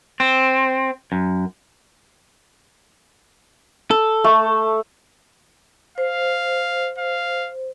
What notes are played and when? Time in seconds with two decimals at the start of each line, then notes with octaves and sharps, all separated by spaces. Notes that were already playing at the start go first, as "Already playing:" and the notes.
0.20 C4
1.12 F#2
3.91 A4
4.24 A3
5.98 C5 F5
6.98 F5